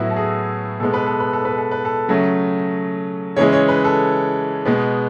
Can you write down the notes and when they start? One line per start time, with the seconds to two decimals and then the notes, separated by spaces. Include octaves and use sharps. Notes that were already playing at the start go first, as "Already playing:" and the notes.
Already playing: A2 F#3 B3 E4 F#4
0.10 A4
0.16 G#4
0.80 B2 G#3 B3 A4
0.94 B4
1.06 A4
1.20 B4
1.33 A4
1.45 B4
1.58 A4
1.71 B4
1.85 A4
2.08 C#3 F#3 A3
3.36 C#3 E3 G#3 C#5
3.53 C#5
3.68 B4
3.84 A4
4.65 B2 G#3 B3